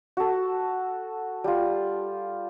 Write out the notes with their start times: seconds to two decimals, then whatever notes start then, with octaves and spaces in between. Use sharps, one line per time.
0.17 F#4 A4
1.44 G3 F4